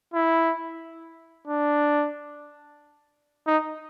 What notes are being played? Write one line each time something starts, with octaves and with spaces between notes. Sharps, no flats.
E4
D4
D#4